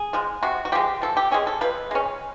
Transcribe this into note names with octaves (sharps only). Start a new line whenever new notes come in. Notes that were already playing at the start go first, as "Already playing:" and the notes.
Already playing: G#4
F3 G#3
C3 F#4
F#4
F3 G#3 G4
F3 A4
G4
G#3 C#4 G#4
A4
F3 B4
G#3 C#4